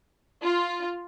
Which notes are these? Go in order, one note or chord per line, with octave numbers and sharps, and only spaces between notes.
F4